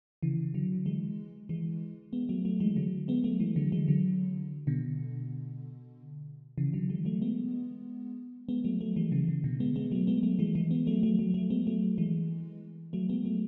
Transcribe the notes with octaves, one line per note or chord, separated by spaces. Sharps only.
C#3 E3
D3 F#3
E3 G#3
E3 G#3
G#3 B3
F#3 A3
F#3 A3
E3 G#3
D3 F#3
G#3 B3
F#3 A3
E3 G#3
D3 F#3
E3 G#3
D3 F#3
B2 D3
C#3 E3
D3 F#3
E3 G#3
F#3 A3
G#3 B3
G#3 B3
F#3 A3
F#3 A3
E3 G#3
C#3 E3
C#3
B2 D3
G#3 B3
G#3 B3
F#3 A3
G#3 B3
F#3 A3
E3 G#3
E3 G#3
G#3 B3
F#3 A3
F#3 A3
F#3 A3
F#3 A3
G#3 B3
F#3 A3
E3 G#3
F#3 A3
G#3 B3
F#3 A3